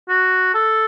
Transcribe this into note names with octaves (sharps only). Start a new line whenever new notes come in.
F#4
A4